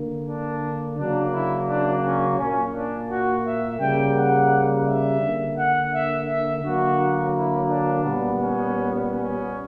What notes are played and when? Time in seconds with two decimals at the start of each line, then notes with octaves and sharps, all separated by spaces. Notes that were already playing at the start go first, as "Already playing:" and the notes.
Already playing: D3 A#3
0.26 D4
0.97 C#3 F#3 A#3 D4
1.32 E4
1.67 D4
2.03 C#4
2.37 A#2 A#3 C#4
2.73 D4
3.09 F#4
3.44 E5
3.79 C#3 G3 A#3 G5
4.15 F#5
4.85 E5
5.20 D3 A#3
5.57 F#5
5.92 E5
6.28 E5
6.62 D3 F#3 A#3 F#4
7.33 E4
7.69 D4
8.04 A#2 G3 B3
8.39 C#4
9.10 C#4